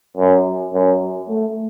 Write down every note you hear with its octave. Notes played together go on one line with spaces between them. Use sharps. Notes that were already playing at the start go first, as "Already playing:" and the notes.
F#2
F#2
A3